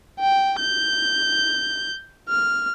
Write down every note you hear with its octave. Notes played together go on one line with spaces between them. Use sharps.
G5
G6
F6